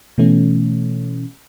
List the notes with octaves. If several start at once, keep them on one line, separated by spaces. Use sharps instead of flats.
B2 E3 A3 C#4